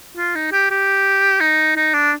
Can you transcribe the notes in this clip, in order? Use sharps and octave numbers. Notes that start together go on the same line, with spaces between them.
F4
D#4
G4
G4
D#4
D#4
D4